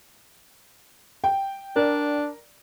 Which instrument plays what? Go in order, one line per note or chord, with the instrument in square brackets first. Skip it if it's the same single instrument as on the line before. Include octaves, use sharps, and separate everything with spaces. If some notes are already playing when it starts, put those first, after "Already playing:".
[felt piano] G5
[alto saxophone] D4 [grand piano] A#4 D5